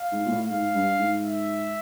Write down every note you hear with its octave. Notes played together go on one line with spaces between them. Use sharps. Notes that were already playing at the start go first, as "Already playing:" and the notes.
Already playing: F5
G#2
A#2
A2
G#2 F5
G2
G#2
E5